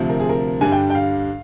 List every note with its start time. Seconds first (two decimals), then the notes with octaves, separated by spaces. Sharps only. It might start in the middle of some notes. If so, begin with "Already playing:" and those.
Already playing: D2 C3 F3 C4
0.09 A#4
0.20 G#4
0.29 A#4
0.61 G2 D3 G3 D4 G#5
0.72 G5
0.90 G5
0.95 F5